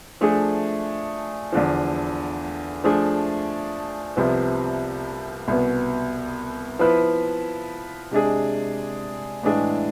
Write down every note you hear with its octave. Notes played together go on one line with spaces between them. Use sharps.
F3 A3 D4 G#4
E2 D3 F3
F3 A3 D4 G#4
C2 C3 F3 B3
C2 B2 B3
F3 B3 E4 B4
C3 G#3 D4 G#4
A2 E3 G#3 D4 G#4